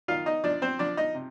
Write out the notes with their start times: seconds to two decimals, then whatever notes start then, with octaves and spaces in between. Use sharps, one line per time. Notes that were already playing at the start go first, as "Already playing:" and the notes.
0.08 D#3 F4 F5
0.26 D#4 D#5
0.44 F3 D4 D5
0.62 C4 C5
0.79 F3 D4 D5
0.97 D#4 D#5
1.15 C3